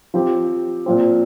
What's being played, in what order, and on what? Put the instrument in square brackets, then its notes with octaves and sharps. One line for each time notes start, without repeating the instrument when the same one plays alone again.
[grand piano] F3 C4 G4
A#2 F3 C4